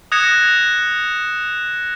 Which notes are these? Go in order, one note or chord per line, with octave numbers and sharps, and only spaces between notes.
D#6 F#6 G#6 A#6 C#7 E7